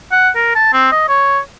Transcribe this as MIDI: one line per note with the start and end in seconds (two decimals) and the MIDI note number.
0.12 0.29 78
0.35 0.53 70
0.55 0.72 81
0.73 0.90 60
0.92 1.08 75
1.09 1.39 73